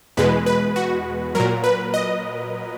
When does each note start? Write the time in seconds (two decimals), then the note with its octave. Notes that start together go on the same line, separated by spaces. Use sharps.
0.17 E2 B2 G#3 B4
0.46 B4
0.76 F#4
1.35 A#2 F#3 A#4
1.64 B4
1.94 D#5